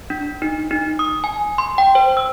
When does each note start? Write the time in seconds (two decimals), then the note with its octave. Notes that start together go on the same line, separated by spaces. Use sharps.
0.10 D4
0.42 D#4
0.71 D#4
0.99 D#6
1.24 G#5
1.58 C6
1.78 G5
1.95 C5
2.17 E6